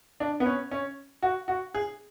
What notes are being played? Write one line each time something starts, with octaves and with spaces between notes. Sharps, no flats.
D4
B3
C#4
C#4
F#4
F#4
G#4